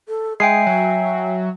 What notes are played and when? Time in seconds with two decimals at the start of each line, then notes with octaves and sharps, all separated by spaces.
0.09 A4
0.40 G#3 E5 G5 G#5 C7
0.66 F#3